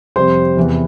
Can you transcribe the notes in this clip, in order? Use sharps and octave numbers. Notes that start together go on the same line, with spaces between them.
F2 C3 G3 C5 C6
E2 C3 E3 B3